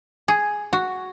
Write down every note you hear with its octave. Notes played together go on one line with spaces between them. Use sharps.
G#4
F#4